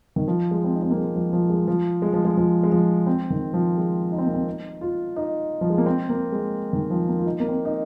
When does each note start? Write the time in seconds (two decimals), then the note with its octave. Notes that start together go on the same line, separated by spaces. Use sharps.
0.16 D#3
0.28 F3
0.51 G#3
0.64 C4
0.74 D#4
0.82 C4
0.90 A#3
0.97 G#3
1.15 F3
1.33 F3
1.50 G#3
1.67 F3
2.02 G#3
2.13 F3
2.25 G#3
2.37 F3
2.63 G#3
2.72 F3
3.07 C4
3.30 D#3
3.54 F3
3.77 G#3
4.12 D#4
4.18 C4
4.26 A#3
4.34 C4
4.47 D#4
4.81 F4
5.16 D#4
5.61 F3
5.70 G#3
5.78 A#3
5.86 C4
6.09 A#3
6.32 G#3
6.73 D#3
6.90 F3
7.08 A#3
7.19 F4
7.26 D#4
7.40 A#3
7.48 C4
7.65 D#4